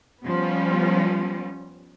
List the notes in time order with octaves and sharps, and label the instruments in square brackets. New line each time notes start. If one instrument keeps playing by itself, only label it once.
[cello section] F3 G3 B3 C#4